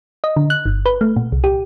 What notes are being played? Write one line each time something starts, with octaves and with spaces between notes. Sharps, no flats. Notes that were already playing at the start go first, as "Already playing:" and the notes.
D#5
D3
F#6
G1
B4
A3
A#2
C2
G4